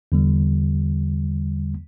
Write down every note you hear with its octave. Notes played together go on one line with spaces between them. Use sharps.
E2 D3 G3